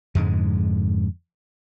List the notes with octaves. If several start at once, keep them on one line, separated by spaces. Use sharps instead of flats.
F2 G#2 D3 G#3